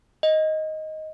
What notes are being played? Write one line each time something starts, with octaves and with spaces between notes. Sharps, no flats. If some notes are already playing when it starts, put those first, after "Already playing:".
D#5